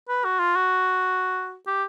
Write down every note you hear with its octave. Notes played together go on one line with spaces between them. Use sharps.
B4
F#4
F4
F#4
G4